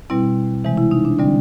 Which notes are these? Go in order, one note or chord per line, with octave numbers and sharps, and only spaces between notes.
B2 G3 C4 E4
C3 E3 G#3
E4
D#4
D4
D3 G3 C4 D4